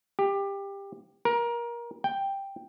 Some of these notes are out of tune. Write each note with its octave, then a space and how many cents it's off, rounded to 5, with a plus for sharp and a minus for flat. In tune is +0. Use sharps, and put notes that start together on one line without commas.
G4 +20
A#4 +25
G5 +5